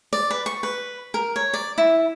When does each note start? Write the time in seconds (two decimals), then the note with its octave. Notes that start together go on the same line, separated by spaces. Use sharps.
0.13 D5
0.31 B4
0.46 C#6
0.63 B4
1.14 A#4
1.36 C#5
1.54 D5
1.78 E4